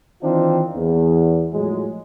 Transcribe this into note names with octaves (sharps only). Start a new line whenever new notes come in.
D#3 E3 C4 D4 D#4 F4
E2
A2 F3 F#3 G#3